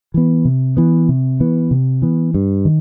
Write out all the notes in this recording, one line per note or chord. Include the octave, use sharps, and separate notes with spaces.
E3 B3
C3
E3 B3
C3
E3 B3
C3
E3 B3
G2
D#3